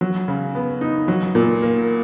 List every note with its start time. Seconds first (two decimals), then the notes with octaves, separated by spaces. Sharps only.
0.01 F#3
0.28 C#3
0.55 B3
0.81 D#4
1.08 F#3
1.35 A#2
1.62 A#3